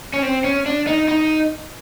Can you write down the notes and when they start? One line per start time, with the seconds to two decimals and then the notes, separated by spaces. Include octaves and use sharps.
0.14 C#4
0.23 C4
0.44 C#4
0.66 D4
0.87 D#4
1.08 D#4